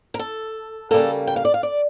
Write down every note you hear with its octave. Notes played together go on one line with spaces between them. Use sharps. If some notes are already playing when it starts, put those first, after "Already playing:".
A#4
A4
C#3 G3 A#3 A4
G5
F5
D5
F5
D5